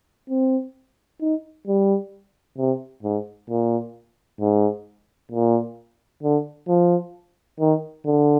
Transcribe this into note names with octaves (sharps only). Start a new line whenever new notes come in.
C4
D#4
G3
C3
G#2
A#2
G#2
A#2
D3
F3
D#3
D3